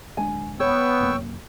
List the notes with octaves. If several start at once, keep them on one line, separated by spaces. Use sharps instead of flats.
D1 G#3 D4 G#5
B3 C#5 G5 C#6 E6
C2 F#2 A#3